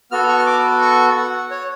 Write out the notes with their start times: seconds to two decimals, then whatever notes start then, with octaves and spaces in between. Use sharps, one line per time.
0.11 B3 F#4 A4 F6
0.28 C#6
0.39 F6
0.46 D6
0.81 C#6
1.16 F#5
1.51 C#5